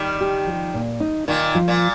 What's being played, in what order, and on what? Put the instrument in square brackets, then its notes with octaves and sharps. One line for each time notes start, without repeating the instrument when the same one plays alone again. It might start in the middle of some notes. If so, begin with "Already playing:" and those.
Already playing: [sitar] D#3 G3
[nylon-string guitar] G4
F3
A#2
D#4
[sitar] A#2 D#3 [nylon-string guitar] D#4
[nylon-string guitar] F3
[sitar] A#2